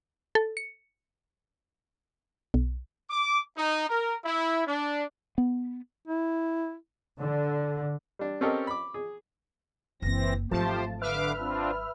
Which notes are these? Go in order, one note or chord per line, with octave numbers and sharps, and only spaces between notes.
A4
C#7
B1
D6
D#4
A#4
E4
D4
B3
E4
D3
G3 D4
C4 C#4 G4 A4 A#4 D#5
B5 D6
G#4
F#1 E3 A#3 C4 A#6
G#1 F3 F#3 A3 G4 C5 A5
D3 B4 E5 F5 D6 F6
C4 D4 F4